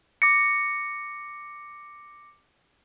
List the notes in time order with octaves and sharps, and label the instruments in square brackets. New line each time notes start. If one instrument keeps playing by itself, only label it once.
[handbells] D6 A#6 C#7